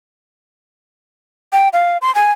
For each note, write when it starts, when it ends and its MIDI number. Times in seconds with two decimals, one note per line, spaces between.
1.53 1.69 79
1.73 1.98 77
2.02 2.13 84
2.15 2.32 80